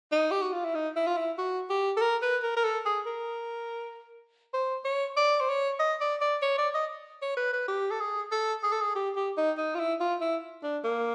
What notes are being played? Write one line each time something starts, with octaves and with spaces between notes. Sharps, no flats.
D#4
G4
F#4
F4
E4
D#4
E4
F4
E4
F#4
G4
A4
A#4
B4
A#4
A#4
A4
G#4
A#4
C5
C#5
D5
C5
C#5
D#5
D5
D5
C#5
D5
D#5
C#5
B4
B4
G4
A4
G#4
A4
G#4
A4
G#4
G4
G4
D#4
D#4
F4
E4
F4
E4
D4
A#3